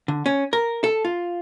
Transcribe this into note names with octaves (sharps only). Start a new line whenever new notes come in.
D3
C#4
A#4
A4
F4